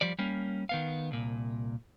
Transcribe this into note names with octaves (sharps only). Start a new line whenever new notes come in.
F3 G3 D5
G3 A#3 C#4
D#3 B3 F5
C2 A#2